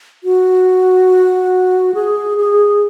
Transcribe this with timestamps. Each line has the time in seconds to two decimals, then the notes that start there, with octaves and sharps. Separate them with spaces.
0.24 F#4
1.94 G#4
2.38 G#4